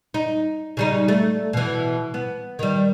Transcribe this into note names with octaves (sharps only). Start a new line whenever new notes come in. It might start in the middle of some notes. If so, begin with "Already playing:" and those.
D#4
C#3 G3 D#4
A3
B2 E3
B3
D#3 G3